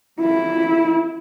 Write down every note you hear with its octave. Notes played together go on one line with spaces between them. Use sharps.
E4